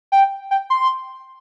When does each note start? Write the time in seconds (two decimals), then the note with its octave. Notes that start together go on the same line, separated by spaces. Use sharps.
0.12 G5
0.51 G5
0.70 C6